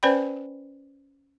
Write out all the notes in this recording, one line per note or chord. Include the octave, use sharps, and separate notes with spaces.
C#4 B4 C5 D5 G5 B5